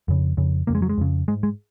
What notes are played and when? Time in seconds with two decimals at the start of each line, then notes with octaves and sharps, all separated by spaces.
0.08 F2 C#3
0.37 F2 C#3
0.67 F2 C#3 A#3
0.75 G#3
0.82 F#3
0.89 G#3
0.97 F2 C#3
1.28 G#2 G#3
1.43 G#3